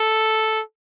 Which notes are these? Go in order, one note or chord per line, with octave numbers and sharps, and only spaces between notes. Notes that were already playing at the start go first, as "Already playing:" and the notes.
Already playing: A4